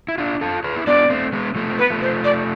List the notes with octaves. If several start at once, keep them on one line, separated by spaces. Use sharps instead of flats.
E4
D4 F4
F4 A4
G#4 B4
E4
B3 D4 D5
A3 C4
G#3 B3
F3 A3
C4
B3 B4
F3 A3
C5
D5